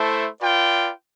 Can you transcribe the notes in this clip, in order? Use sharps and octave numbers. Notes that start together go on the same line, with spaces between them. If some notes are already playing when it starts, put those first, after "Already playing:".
Already playing: A3 E4 A4 C5
F4 B4 D5 G5